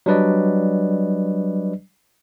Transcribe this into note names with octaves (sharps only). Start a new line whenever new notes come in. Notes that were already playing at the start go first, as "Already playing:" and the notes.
F#3 G3 D4 B4 D5 D#5